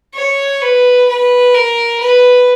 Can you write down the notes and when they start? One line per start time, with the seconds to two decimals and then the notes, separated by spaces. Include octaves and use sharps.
0.14 C#5
0.62 B4
1.08 B4
1.54 A#4
2.00 B4